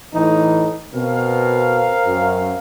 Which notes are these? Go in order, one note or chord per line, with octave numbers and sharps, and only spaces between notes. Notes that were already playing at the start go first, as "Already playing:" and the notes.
A2 E3 D#4
B2 C4 A#4 F5
F#2